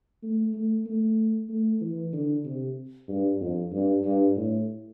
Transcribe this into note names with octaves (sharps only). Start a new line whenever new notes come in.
A3
A3
A3
A3
E3
D3
C3
G2
F2
G2
G2
A2